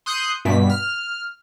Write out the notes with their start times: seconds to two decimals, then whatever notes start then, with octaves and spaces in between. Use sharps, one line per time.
0.06 C6 D#6 F#6 G6 C#7
0.45 G2 B2 B6
0.70 F6